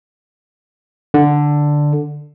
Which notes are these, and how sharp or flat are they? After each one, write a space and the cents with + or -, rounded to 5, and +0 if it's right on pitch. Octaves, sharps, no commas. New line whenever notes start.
D3 +5